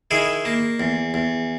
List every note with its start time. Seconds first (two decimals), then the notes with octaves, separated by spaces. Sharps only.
0.11 D#3 E4 G#4
0.45 A#3
0.80 E2
1.14 E2